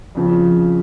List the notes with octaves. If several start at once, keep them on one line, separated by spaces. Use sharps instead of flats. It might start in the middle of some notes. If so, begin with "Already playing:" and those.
F2 C#3 F3